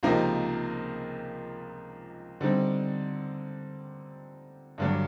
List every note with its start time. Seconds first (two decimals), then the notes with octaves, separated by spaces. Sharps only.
0.03 C#2 C3 F3 A#3 D#4
2.41 D3 G3 C4 D#4
4.78 G2 D3 F#3